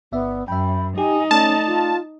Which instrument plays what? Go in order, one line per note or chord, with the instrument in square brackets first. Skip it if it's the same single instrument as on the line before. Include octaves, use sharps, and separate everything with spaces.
[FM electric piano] G1 D5 E5 [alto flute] B3
[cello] F#2 [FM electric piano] E5 G5 [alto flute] B5
[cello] D#4 [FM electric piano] G4 [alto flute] G#5
[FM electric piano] A3 D5 [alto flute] C#4 [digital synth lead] A5
[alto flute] F4